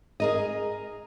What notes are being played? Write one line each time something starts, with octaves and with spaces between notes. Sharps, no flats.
G#4 A#4 D#5